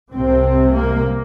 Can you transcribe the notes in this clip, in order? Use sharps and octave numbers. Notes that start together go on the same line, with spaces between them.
C2 C3 C4
A#3